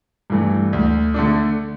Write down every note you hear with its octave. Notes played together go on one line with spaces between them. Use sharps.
G2 E3 A3
D2
D3 A3 D4